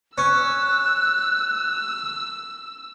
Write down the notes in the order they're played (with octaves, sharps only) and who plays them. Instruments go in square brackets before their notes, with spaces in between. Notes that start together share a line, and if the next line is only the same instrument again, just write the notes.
[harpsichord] C#4 [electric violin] E6 [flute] F#6